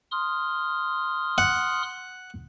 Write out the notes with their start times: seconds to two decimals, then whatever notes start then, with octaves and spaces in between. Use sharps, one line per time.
0.11 C6 D#6 F6
1.38 F#5